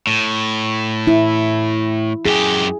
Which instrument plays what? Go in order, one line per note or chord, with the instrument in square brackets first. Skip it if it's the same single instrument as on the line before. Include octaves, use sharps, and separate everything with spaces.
[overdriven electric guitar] A2
[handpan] E4
[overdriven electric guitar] F#2 G4 [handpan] G#4